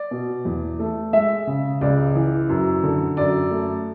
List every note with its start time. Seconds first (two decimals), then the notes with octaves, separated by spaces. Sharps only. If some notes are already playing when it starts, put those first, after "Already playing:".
Already playing: D5
0.11 B2
0.45 E2
0.79 A3
1.13 G#3 E5
1.47 C#3
1.81 C#2 D5
2.15 E3
2.49 F#2
2.84 D3
3.17 F#2 D5
3.51 A3